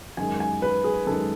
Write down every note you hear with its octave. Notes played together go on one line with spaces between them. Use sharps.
F#2 D#3 G#3 G#5
G#5
B4
G#4
F#2 D#3 G#3 A4